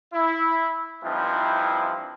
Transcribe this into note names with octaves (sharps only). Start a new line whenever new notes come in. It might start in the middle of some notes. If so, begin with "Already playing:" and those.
E4
G2 E3 F3 C4 D#4 E4